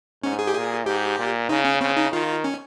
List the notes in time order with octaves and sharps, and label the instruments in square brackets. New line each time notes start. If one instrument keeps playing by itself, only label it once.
[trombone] G#2 [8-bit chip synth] C#4
[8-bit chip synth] G#4
G4
[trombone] A#2 [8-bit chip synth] G#4
[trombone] G#2 [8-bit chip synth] G4
[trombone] A#2
[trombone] C#3 [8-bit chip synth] D#4
[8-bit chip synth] C#4
[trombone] C#3 [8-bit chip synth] C4
[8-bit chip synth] D#4
[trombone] D#3 [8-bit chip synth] F4
[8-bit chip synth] C#4